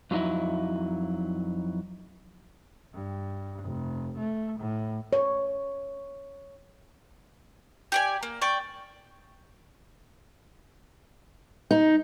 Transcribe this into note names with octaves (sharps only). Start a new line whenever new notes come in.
F2 F#3 C#4 D#4 E4
G2
F1
A3
A2
C#5
G4 D5 G#5
A#3
D5 G5 C#6
D#4